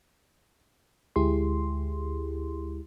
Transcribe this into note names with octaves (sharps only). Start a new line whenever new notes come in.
D2 G#3 E4 G4 G#4 C6